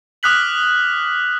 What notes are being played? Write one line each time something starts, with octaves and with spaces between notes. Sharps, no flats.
D6 D#6 F6 F#6 B6 F#7